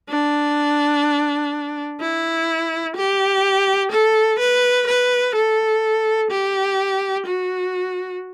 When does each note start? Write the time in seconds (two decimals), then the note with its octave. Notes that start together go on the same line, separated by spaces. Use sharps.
0.09 D4
2.00 E4
2.96 G4
3.92 A4
4.39 B4
4.87 B4
5.35 A4
6.31 G4
7.26 F#4